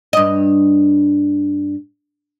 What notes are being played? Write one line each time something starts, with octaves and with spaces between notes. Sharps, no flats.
G2 D#5